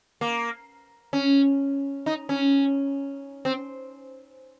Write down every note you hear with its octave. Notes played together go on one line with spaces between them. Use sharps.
A#3
C#4
D#4
C#4
C4